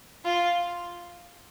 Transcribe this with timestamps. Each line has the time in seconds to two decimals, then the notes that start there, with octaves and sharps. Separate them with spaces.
0.25 F4